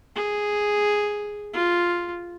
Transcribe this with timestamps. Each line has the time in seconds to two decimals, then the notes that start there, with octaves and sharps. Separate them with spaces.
0.15 G#4
1.53 F4